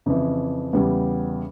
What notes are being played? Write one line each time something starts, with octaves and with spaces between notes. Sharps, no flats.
F2 C#3 E3
E2 C#3 G3